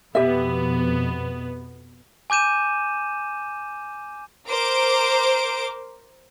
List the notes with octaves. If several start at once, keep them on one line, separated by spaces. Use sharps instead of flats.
F2 B2 B3 G4 E5
G#5 D6 G6 D#7 E7
A#4 C5 D6 D7